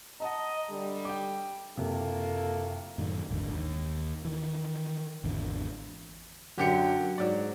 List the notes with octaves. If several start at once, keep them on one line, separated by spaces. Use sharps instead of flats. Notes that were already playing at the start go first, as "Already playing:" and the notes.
D#5 F#5 A5 A#5
D3 G3
G5 D6
F#1 C3 A#3 F4 A4
F#2 A2 D#3
D#1 G#1 E2 D3
D#2
D#3 E3
G#1 E2 D3
F#2 D3 G4 C#7
G#2 F#3 D5